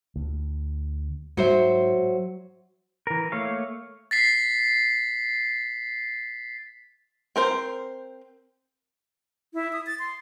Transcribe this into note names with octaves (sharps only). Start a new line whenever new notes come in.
D2
G#2 F#3 C5 E5
E3 A#4
A3 A#3 C#5 F5
A6 B6 C7
C4 A#4 C5
E4
D#6
A6
C6